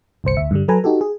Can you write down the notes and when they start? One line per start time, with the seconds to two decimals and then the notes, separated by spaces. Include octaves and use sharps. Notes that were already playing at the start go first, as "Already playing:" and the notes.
0.24 G1 C2 C5 C#7
0.37 D2 E5
0.51 G2 D3 G3
0.68 F#3 A4 B4 G#5 A#5
0.84 D#4 F#4 G4 A4
1.01 G#4